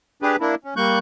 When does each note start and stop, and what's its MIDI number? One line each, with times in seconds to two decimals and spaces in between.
0.22 0.36 62
0.22 0.36 67
0.22 0.36 68
0.22 0.36 71
0.40 0.55 58
0.40 0.55 62
0.40 0.55 64
0.64 0.74 61
0.76 0.99 55
0.76 0.99 58
0.76 0.99 85
0.76 0.99 90
0.76 0.99 91